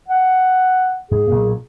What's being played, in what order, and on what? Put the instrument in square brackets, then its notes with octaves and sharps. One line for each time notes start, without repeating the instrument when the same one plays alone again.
[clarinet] F#5
[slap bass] G#2 [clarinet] G#4
[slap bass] B1 A#2 A#3